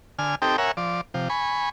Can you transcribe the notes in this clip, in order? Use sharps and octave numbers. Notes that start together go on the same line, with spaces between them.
D3 G#5 F6
C4 D#4 G4 A4 G5
A#4 C#5 E5 F#5 G#5
F3 D5
C3 F3
G#5 B5 C#6